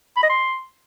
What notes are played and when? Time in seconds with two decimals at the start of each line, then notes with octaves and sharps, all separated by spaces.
0.17 B5
0.23 D#5
0.30 C6